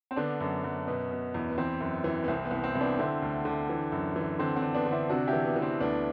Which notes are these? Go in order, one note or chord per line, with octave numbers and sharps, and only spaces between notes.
C4
D3 B3 D4
F#2
F#2
B2 B3
B2
E2
B3
E3 C4
F#2
E3
B3
C2 C4
B3
C2
B3
C4
C2
B3 D4
D3 C4 E4
D2
D3
E3
F#2
E3
D3 C4
C4
D3
B3 D4
D3
C4 E4
C3 D4 F#4
E4 G4
E3
B3
E3
C4
D2 B3 D4